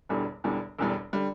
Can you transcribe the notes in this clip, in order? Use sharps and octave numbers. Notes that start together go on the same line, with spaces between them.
E1 E2 D3 G3
E1 E2 D3 G3
E1 E2 D3 G3
D3 G3